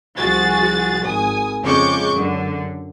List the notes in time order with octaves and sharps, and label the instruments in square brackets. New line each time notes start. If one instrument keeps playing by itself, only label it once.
[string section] C2 F3 F#4 G#4 A6
G#1 G#5 D#6
F2 C#3 G#3 C#6 D6 G6
F#2 D3